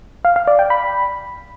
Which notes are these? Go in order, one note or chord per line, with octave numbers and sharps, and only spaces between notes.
F5
F5
D5
G5
B5